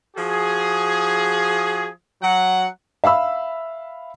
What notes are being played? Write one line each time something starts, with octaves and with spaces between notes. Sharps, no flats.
F3 F#4 G#4
F#3 F#5
E5 F5 B5 E6